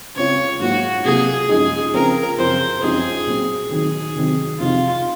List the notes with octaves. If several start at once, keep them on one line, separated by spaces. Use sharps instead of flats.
C#3 G#3 C4 F4 C#5
G#2 F#3 A#3 F4 F#4
C3 F#3 A#3 F4 G#4
F#2 F3 G#3 D#4 G#4
C#3 F3 C4 A#4
F#2 C#3 F3 C4 F4 C5
F#2 F3 C4 D#4 G#4
A#2 F#3 C4
D#3 F#3 C4 D#4 G#4
C3 D#3 F#3 C4 D#4
F2 C3 F3 C4 D#4 F4